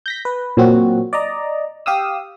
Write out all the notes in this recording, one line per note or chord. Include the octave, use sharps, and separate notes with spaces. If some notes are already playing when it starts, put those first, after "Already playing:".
G6 A#6 B6
B4
A#2 F#3 C4 F#4
D5 D#5 A#5
G4 F5 D#6 E6